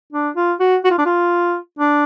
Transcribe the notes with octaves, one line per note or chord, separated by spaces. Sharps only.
D4
F4
F#4
F#4
F4
D4
F4
D4